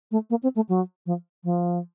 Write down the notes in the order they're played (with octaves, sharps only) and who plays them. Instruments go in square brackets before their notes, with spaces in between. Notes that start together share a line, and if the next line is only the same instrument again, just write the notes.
[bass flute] A3
A#3
C4
A3
F#3
F3
F3